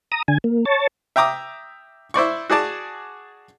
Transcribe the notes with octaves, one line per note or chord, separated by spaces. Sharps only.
A#5 D#6
D3 G#5
A#3
C#5 A5
E5 G5 A#5 D6 D#6
E4 C5 D5 C#6
F#4 G#4 D5 A5